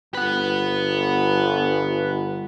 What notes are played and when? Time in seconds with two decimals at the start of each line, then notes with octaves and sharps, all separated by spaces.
0.15 G1 B4 F#5